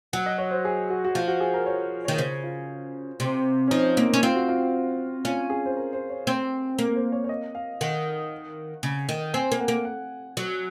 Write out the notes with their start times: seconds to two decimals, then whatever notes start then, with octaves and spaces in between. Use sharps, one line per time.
0.13 F#3 F#5
0.26 D#5
0.38 C#5
0.51 C5
0.65 G#4
0.90 F#4
1.04 F#4
1.15 F3 F4
1.28 F#4
1.40 G#4
1.54 A#4
1.66 C#5
2.05 D#3 C#5
2.18 C#3 C5
2.43 F4
3.20 C3
3.67 C#4
3.71 F3 D#4
3.97 A#3 C4
4.13 C#4
4.23 C4 F4
4.35 F#4
4.49 F4
5.25 C#4 F4
5.50 G#4
5.66 C5
5.77 A#4
5.93 C5
6.09 C#5
6.27 C4 C5
6.78 A#3 A#4
6.95 C5
7.12 C#5
7.24 C#5
7.29 D#5
7.55 F5
7.81 D#3 F#5
8.83 C#3
9.09 D#3
9.33 C4 G#5
9.52 A#3
9.60 F#5
9.68 A#3
9.85 F#5
10.37 F#3